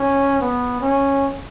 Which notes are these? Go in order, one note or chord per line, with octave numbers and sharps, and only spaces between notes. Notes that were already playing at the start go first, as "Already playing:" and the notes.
Already playing: C#4
B3
C#4